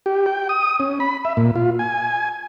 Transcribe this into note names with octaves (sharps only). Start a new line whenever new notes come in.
G4
G5
D#6
C#4
B5
E5
A#2
F4
G#5